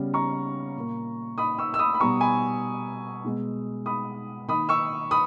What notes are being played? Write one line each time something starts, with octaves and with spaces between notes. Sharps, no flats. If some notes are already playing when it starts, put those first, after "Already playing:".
Already playing: C#3 G3 B3
A#5 C#6
A#2 A#3
B5 D#6
C#6 E6
E6
B5 D#6
B5
B2 G3 B3 A#5 C#6
G#5 B5
B2 G#3 B3
B5 D#6
D#3 A#3 B5 D#6
C#6 E6
B5 D#6